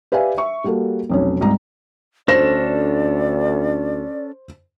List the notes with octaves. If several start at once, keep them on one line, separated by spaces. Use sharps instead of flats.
G4 B4 D5 E5 F5 G#5
E5 C#6
G3 A#3 F#4 A4
F1 B1 C#4
C2 G#2 A#5
D2 C#4 D4 A4 C5 D5 A#6 E7